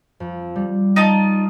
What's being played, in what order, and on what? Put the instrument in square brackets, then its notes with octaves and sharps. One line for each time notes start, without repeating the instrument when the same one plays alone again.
[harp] F2
G3
[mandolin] D#4 F4 A5